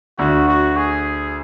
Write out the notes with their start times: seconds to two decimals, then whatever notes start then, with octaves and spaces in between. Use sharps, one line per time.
0.19 D2 D3 F#4
0.48 F#4
0.77 G#4